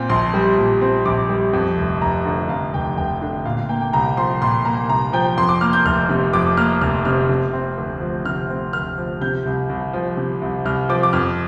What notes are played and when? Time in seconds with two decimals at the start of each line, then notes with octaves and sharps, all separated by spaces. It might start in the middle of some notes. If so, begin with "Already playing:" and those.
Already playing: A#2 C4
0.09 A#1 C6
0.34 G3
0.58 A#2
0.81 C4
1.05 A#1 D6
1.29 G3
1.53 F2
1.77 F1
2.01 F1 A#5
2.25 D3
2.49 F2 F5
2.74 F1 G5
2.97 F1 G5
3.22 D3
3.45 A#2 F5
3.57 F5
3.69 A#3 G5
3.81 G5
3.93 C2 A#5
4.17 F3 C6
4.41 A#2 C6
4.65 A#3 A#5
4.89 C2 A#5
5.13 F3 G5
5.37 F2 C6
5.49 D6
5.61 A#3 F6
5.73 G6
5.85 F1 F6
6.09 C3
6.33 F2 D6
6.57 A#3 F6
6.81 F1 F6
7.05 C3 F6
7.29 C3
7.53 C4
7.77 D2
8.01 F3
8.25 C3 F6
8.49 C4
8.73 D2 F6
8.98 F3
9.21 C3 G6
9.45 C2
9.69 C2
9.93 F3
10.17 C3
10.41 C2
10.65 C2 F6
10.89 F3 D6
11.03 D6
11.13 F2 F6